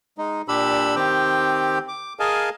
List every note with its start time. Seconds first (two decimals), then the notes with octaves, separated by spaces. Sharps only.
0.18 G#3 D#4
0.48 A#2 D4 G4 B5 E6
0.96 D#3 C4 G4 G5
1.88 D6
2.19 G#4 A#4 D#5 F5 G#5 A5